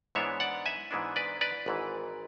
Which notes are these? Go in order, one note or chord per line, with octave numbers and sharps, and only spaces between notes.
G#2 E3 G#3 B3 D4 C#5 E5
D5 F#5
E5 G#5
G#2 E3 G#3 B3 D4
B4 D5
B4 D5
G#1 G#2 E3